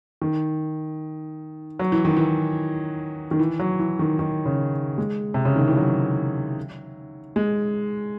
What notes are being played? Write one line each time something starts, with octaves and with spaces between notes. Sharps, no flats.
D#3
F#3
E3
D#3
E3
D#3
E3
F#3
E3
D#3
D#3
C#3
G#3
C3
C#3
D#3
E3
F#3
G#3